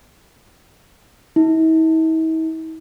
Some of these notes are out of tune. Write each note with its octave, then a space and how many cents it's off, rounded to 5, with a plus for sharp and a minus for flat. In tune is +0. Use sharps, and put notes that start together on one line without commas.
E4 -45